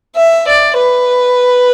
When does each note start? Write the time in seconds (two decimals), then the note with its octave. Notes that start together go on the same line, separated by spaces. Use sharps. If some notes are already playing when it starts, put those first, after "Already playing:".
0.17 E5
0.47 D5
0.77 B4